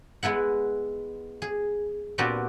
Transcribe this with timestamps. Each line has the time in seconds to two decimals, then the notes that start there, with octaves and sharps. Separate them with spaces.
0.23 G#3 B3 E4 F#5
1.42 G#4
2.18 A#2 B3 C4 D4 F#4 G4